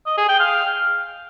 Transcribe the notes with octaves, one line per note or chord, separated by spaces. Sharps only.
D#5
G#4
G5
F5